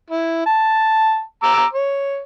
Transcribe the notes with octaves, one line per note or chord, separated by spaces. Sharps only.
E4
A5
A#5 D6 E6
C#5